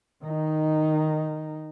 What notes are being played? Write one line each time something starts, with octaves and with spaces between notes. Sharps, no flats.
D#3 D#4